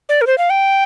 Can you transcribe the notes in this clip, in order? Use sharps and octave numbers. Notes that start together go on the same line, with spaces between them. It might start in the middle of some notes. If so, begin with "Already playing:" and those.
D5
A#4
C5
F5
G5